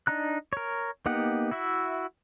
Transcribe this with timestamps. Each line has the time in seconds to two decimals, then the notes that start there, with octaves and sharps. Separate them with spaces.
0.07 D4 D#4 A#5 F#6
0.53 A#4 C#5
1.06 A#3 B3 D#4 G4 F#5
1.51 E4 F#4 E5